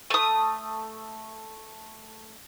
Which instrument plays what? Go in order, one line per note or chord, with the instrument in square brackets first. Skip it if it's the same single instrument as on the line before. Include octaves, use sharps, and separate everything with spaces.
[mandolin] A3 D#6